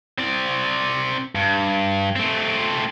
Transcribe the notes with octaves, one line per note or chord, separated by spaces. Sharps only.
C4 D5
G2
A3 C4